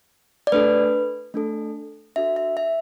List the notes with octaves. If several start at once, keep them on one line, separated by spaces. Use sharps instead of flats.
D5
A3 D4 A4 B4
A3 D4 A4
D4 F#4 A4 E5
E5
E5